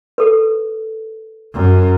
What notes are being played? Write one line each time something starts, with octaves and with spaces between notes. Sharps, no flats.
A4 B4
F#2